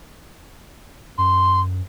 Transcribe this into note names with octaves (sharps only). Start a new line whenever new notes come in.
F#2 C6